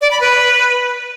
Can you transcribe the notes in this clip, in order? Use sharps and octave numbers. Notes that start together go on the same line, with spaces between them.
D5
B5
B4